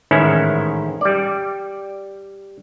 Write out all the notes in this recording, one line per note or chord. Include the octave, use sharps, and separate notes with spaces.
A1 G#2 D#3 C#4 E4
G3 D5